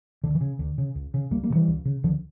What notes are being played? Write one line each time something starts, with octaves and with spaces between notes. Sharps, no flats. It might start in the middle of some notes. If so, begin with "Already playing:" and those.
D2 D3
E3
C#3
D2
C#3
C#2
C#3
C#2 G3 A#3
G3 A#3
C#3
E3 G3
C#2
C#3
C#2 D3 F3